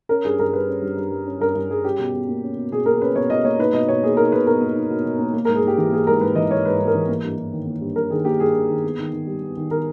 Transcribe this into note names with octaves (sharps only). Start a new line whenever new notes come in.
C#4 A#4
G2 G#4
G2 A#4
G3 B4
C#4
G2
G2
G3
C#4
G2 A#4
G2
G3 G#4
C#4 G4
B2
B2
A#3
C#4
B2
B2 G#4
A#3 A#4
C#4 B4
B2 C#5
B2 D#5
A#3 C#5
D#4 B4
B2 D#5
B2 C#5
A#3 G#4
D#4 A#4
B2 B4
B2 A#4
A#3
D#4
B2
B2
A#3
A#3
G#2 A#4
G#4
G#2 G4
E3 G4
A#3 G#4
G#2 A#4
G#2 B4
E3 D#5
A#3 C#5
G#2 B4
G#2
A#4
E3
A#3
G2
G2
D#3
A#3
G2
G2 A#4
D#3 G#4
A#3 G4
G2 G#4
G2
D#3
B3
D#3
D#3
G3
B3
D#3
D#3 A#4